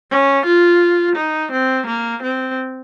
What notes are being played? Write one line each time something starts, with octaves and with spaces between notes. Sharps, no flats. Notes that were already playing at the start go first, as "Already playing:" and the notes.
C#4
F4
D#4
C4
A#3
C4